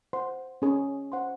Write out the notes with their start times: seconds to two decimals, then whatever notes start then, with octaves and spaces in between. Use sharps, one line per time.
0.13 C5 F#5 C6
0.62 C#4 G#4 C#5 G#5
1.12 C5 F#5 C6